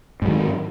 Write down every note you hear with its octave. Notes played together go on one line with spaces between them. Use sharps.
G#2 D#3 F#3